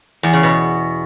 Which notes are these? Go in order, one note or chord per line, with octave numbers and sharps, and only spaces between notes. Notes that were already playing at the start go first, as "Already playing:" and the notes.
E2
C#3
B2